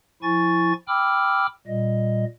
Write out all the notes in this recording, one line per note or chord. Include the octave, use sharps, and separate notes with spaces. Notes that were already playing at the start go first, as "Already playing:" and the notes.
F3 E4 G#5 C#6 A6
G5 B5 D6 E6 F6
A#2 G3 D#5